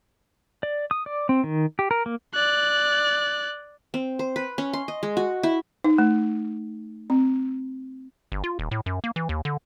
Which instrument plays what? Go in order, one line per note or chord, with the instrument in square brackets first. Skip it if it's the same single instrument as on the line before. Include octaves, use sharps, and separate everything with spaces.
[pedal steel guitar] D5
D#6
D5
C4
D#3
G4
A#4
A#3
[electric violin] D5 F#6
[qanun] C4
C5
B4
C#4
C6
D#5
G#3
F#4
E4
[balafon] D#4
A3
C4
[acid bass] G1
F4
D#1
A2
F#2
A#3
E3
D#2
D3